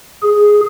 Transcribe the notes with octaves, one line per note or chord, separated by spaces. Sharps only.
G#4